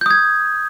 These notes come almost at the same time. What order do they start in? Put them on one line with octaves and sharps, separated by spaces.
G6 D#6 G#6